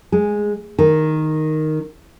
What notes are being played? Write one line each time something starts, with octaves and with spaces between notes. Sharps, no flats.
G#3
D#3